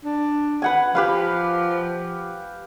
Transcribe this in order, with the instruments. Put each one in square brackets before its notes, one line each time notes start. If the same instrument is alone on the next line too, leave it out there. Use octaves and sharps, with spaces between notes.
[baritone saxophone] D4
[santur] B4 F#5 G#5
[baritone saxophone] F3 [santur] G4 B4 F5